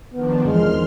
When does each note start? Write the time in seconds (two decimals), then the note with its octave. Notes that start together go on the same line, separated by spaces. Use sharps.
0.14 D#3 F3 B3 D4
0.46 E2 D#3 F3 G#3 C6 F6